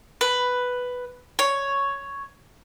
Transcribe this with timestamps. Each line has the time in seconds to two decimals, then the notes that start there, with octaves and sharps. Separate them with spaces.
0.21 B4
1.39 C#5